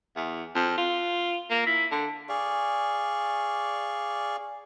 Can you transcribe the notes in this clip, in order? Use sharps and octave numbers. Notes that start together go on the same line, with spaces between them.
E2
F2
F4
A#3
E4
D3
G#4 D5 F5 C#6